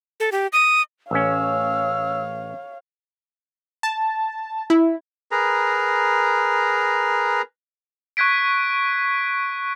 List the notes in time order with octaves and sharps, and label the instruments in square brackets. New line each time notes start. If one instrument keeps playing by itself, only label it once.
[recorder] A4
G4
D#6
[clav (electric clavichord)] A1 C#4 [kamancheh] C#5 F5 [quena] E6
[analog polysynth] A5
E4
[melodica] G#4 A#4 B4 A#5
[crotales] C#6 F#6 G#6 B6 D7